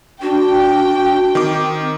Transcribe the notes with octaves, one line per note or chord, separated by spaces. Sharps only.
D4 F#4 G5
D#3 C4 D6